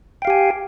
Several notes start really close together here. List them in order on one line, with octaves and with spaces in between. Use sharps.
G5 F5 G4 G#5